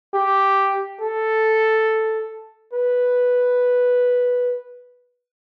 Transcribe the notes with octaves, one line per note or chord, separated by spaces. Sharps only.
G4
A4
B4